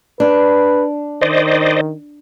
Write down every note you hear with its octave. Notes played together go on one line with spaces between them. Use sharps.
D4 B4
D#3 C5 D5 D#5